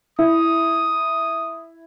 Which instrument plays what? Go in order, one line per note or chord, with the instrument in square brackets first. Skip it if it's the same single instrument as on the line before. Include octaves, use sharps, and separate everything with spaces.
[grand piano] E4 [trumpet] D#6